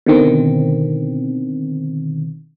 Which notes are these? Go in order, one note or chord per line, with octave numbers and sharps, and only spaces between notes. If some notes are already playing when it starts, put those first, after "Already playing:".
B2 D3 D#3 C4